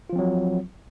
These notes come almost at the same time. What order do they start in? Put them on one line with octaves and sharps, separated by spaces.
F4 F3 C4 F#3